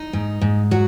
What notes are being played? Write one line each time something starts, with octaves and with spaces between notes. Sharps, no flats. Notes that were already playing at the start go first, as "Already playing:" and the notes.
Already playing: D#4
G#2
G#2
F#3 F#4